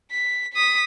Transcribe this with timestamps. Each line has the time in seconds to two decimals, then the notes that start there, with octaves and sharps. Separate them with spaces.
0.11 B6
0.53 D#6 B6